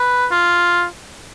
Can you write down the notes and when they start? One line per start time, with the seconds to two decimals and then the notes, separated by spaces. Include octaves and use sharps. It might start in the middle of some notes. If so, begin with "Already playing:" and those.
Already playing: B4
0.31 F4